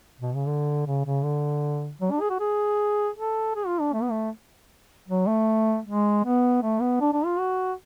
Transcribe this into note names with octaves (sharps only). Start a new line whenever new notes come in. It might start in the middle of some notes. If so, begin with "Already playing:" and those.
B2
C#3
D3
C#3
C#3
D3
F#3
D4
G#4
F#4
G#4
A4
G#4
F4
D4
A3
B3
A3
F#3
A3
G#3
B3
A3
B3
D4
D4
F4
F#4